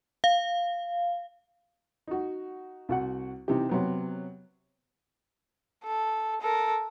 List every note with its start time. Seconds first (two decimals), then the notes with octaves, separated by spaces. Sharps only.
0.24 F5
2.07 D#4 F#4
2.89 C2 F#4 F#5
3.48 C3 E3 D#4 G4
3.69 C3 F#3 B3
5.84 A4
6.41 A4 A#4